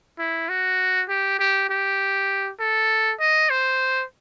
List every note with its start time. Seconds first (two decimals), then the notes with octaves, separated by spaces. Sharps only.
0.19 E4
0.49 F#4
1.09 G4
1.39 G4
1.69 G4
2.60 A4
3.20 D#5
3.50 C5